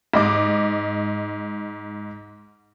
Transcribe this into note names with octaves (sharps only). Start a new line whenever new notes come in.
G#2 D#5 D6